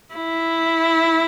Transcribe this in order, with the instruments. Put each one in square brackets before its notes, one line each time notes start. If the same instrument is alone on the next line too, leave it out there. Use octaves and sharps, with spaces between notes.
[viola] E4